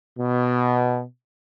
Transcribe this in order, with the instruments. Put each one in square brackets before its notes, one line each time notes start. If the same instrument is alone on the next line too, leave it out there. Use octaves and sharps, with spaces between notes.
[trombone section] B2